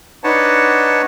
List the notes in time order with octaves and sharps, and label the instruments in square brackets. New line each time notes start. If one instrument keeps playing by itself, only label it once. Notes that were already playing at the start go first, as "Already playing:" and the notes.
[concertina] D4 D#4 B4 C#5 F#5 A5